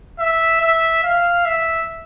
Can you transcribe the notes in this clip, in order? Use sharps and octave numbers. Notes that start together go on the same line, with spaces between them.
E5
E5
F5
E5